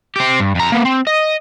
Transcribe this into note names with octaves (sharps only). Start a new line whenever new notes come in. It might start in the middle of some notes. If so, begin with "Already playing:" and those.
C4 G4
G2
F2 A#5
A#3 B3
C4
D#5